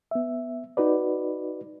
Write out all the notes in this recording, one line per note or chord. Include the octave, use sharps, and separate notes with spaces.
B3 E5
D#4 F#4 B4 D5